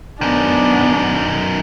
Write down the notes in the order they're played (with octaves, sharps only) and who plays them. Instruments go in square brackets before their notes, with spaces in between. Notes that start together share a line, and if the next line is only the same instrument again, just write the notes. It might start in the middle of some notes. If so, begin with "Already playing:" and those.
[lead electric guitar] F#2 D#3 [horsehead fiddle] B3 D4